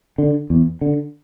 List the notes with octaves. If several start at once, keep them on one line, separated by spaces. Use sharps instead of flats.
D3
E2
D3